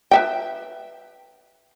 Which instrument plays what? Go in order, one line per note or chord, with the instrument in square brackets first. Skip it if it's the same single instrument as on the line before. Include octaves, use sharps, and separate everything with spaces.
[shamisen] B4 E5 G5